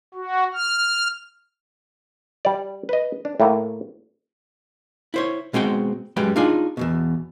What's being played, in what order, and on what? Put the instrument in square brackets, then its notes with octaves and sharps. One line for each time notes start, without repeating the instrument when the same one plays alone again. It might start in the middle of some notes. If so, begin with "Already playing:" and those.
[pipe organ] F#4
F6
[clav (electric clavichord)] G3 D5
B4 D#5
D4
A2 A3 A#3
[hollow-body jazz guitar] E4 C5 C#5
B2 G#3 C4 F#4 G5
F#2 G3 G#3 B4 G5 B5
D4 D#4 F4 G#4 D5 G#5
E2 G#2 B2